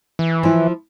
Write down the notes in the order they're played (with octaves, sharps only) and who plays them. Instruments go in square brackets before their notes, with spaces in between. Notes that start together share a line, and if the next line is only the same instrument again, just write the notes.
[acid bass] E3
[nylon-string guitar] F3 E4